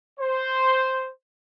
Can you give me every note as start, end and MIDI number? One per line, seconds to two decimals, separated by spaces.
0.19 1.09 72